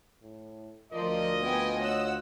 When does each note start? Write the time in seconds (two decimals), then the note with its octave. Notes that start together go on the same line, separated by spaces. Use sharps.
0.21 A2
0.92 D2 F3 F4 A#4 D5 D#5
1.42 A3 B3 G5 G#5
1.80 C#5 F#5 E6